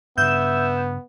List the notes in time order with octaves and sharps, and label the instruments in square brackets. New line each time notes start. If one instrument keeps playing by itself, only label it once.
[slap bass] G2 C#3 [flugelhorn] B3 [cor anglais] E5 [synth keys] G6 E7